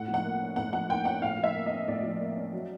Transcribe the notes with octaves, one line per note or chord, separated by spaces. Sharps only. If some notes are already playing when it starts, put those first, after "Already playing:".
Already playing: A2 F#5
F3
F#5
A#3
C#4
A2 F#5
F3 F#5
A#3 G5
C#4 F#5
A2 F5
F3 E5
A#3
D#5
C#4
A2 D5
F3
A#3
C#4
F#3